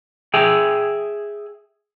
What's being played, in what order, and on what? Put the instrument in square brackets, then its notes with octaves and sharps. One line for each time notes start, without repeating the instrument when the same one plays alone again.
[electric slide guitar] G#4 E5 G5